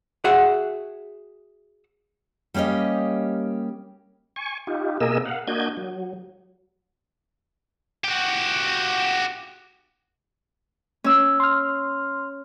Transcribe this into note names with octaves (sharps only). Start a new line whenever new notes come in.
F#4 G#4 E5 F#5
G3 A#3 C#4 G4 D#5
G#5 C#6
D#4 F4 G4
B2 A#3 G#4 A#4 D#5 E6
F5 F#5
A#3 D4 F#4 D#5 G6 G#6
F#3
F#4 G4
C#4 E6
C6 F6